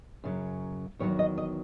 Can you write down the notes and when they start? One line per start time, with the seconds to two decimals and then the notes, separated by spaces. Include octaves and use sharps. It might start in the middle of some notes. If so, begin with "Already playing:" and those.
0.24 F#2 C#3 F#3
0.99 E2 D#3 F#3 C#5
1.19 D#5
1.38 D#5